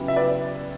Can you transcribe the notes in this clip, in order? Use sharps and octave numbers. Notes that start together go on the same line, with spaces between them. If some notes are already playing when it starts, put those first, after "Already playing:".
Already playing: C#3 F#3 B3 E4 G4
E5
B4 D5